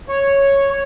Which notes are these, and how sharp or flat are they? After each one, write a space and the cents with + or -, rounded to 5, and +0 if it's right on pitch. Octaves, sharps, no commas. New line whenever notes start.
C#5 -5